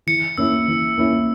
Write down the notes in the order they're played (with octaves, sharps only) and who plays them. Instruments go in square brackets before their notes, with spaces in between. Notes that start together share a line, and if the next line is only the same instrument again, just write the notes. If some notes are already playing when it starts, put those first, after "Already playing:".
[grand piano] E3 [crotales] C#7
[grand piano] A#3 C#4 E4 [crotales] E6
[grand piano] E3
A#3 C#4 E4